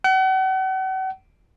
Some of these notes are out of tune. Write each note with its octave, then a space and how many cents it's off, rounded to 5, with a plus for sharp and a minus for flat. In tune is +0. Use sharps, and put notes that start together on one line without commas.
F#5 +40